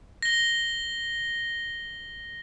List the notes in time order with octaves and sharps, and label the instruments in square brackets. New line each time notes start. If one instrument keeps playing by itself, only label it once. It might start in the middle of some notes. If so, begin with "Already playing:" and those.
[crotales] A#6 G7